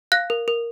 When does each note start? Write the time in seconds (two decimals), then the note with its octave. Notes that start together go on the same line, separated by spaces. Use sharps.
0.12 F5 F#6 A#6
0.30 A#4
0.48 A#4